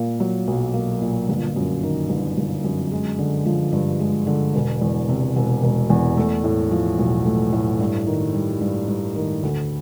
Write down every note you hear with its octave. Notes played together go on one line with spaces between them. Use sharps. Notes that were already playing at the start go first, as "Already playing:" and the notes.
Already playing: A#2 A#3
F#3
B1
A#3
A#2
G1
F#2
D#3
G1
G1
F#2
G#3
D3
F3
G2
G#3
D3
E1
E2
C3
E1
E1
E2
A3
A2
F3
B1
A3
A2
G2
D#3
G3
G2
G2
D#3
D2